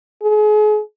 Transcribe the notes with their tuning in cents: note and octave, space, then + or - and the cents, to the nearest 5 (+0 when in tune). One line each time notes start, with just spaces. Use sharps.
G#4 +35